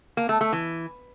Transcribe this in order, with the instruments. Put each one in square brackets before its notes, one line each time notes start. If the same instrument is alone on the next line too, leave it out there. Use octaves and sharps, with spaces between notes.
[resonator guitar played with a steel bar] A#3
A3
A3
E3